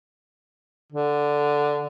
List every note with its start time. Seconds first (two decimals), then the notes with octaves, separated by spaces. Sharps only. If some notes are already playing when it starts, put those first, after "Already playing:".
0.92 D3